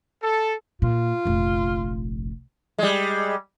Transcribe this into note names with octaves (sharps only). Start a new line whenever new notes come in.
A4
A#2 F4
F1 A#1
G3 G#3